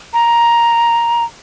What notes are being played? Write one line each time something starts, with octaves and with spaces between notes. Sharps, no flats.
A#5